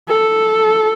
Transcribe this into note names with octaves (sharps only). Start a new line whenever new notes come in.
A4